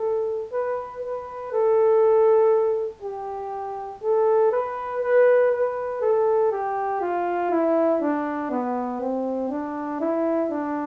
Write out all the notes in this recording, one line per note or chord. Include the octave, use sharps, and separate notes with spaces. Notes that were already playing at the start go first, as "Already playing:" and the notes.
Already playing: A4
B4
B4
A4
G4
A4
B4
B4
B4
A4
G4
F4
E4
D4
B3
C4
D4
E4
D4